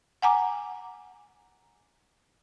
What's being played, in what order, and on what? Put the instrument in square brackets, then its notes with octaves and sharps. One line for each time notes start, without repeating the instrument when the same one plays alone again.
[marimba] F#5 G#5 A#5 D6